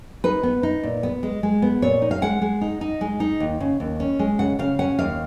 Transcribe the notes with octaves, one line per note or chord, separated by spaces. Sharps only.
D#4 B4
B3
D#4
A#2
B3
G#3
G#3
B3
A#2 C#5
D#4
F5
G#3 F#5
G#3
D#4
D#4
G#3
D#4
D#2
C#3
D#2
C#4
G#3
C#3 F#5
C#3 F5
C#4 F#5
D#2 F5